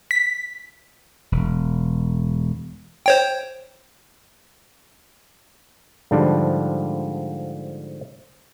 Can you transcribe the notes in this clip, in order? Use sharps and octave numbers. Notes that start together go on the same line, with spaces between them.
B6
E1
C5 C#5 G5
G#2 D3 F3 G3 D4 F4